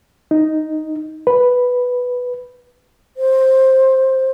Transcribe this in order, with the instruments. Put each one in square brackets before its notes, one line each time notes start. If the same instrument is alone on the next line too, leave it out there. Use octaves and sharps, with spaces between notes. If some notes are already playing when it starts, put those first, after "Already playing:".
[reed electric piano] D#4
B4
[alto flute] C5